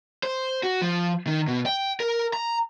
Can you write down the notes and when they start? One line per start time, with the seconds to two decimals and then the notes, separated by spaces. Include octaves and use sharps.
0.23 C5
0.63 F#4
0.82 F3
1.27 D#3
1.48 B2
1.66 G5
2.00 A#4
2.33 A#5